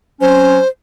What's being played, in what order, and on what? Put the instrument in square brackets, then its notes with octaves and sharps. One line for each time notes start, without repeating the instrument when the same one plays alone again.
[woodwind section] F#3 C4 C#4 [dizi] C5